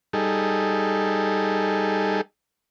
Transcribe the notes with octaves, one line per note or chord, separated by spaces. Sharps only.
G3 D#4 G#4 A4